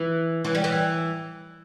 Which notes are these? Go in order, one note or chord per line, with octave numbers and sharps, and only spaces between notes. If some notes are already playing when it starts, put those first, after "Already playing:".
Already playing: E3
E3
G3
E3